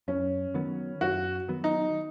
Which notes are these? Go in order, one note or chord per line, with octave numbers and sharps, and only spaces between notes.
F#2 C#4
D#3 F#3 B3
F#2 F#4
D#3 F#3 B3
D#4